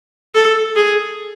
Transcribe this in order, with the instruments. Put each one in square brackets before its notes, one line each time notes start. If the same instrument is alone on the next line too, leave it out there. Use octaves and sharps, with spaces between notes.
[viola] A4
G#4